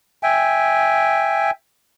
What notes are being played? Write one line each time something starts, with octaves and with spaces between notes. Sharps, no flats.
E5 G5 G#5